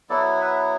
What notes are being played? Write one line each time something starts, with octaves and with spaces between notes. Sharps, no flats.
F#3 B3 E4 A4 D5
B4 E5